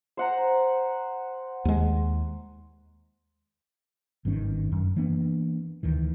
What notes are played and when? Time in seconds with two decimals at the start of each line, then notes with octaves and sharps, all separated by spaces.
0.17 C5 F#5 A#5
1.65 D#2 G#3
4.25 G#1 G2 D#3 C#4
4.72 F#2
4.96 E3 A#3 B3 D4
5.83 D2 D#3 E3